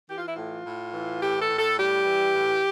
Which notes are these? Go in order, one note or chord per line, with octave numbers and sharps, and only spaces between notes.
E3 G4
F4
E4
A2 F4
A2
E3
A2 G4
A4
A2
A4
G3 G4
E3
A2